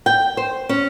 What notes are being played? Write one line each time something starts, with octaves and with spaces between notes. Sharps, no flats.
G5
C5
C#4